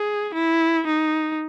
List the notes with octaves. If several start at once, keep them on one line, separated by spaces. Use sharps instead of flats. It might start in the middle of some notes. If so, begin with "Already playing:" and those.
Already playing: G#4
E4
D#4